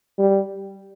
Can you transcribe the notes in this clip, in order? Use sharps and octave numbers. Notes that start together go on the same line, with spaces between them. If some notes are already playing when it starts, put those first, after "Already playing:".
G3